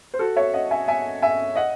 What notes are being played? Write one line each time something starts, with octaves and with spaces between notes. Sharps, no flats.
C5
F#4 A4
C#5 E5
D#5 F#5
E5 G#5
E5 G#5
E5 G#5
D#5 F#5